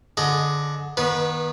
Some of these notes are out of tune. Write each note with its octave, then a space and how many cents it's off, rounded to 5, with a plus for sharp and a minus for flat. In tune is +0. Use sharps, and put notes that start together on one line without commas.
D3 +0 G#4 +25 D#5 +0
D#3 +0 B3 -30 B4 -15